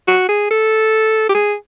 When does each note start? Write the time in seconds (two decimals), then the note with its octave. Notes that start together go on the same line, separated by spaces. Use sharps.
0.08 F#4
0.29 G#4
0.51 A4
1.29 G4
1.35 G#4